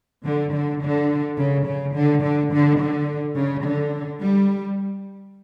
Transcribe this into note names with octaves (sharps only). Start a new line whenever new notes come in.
D3
D3
D3
C#3
C#3
D3
D3
D3
D3
C#3
D3
G3